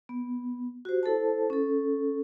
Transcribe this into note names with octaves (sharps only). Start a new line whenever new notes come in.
B3
F#4 G4 C5
E4 A4 C5 A5
C#4 A4